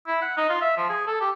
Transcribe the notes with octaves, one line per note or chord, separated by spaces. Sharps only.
E4
F#5
D#4
F4
E5
F3
G#4
A4
G4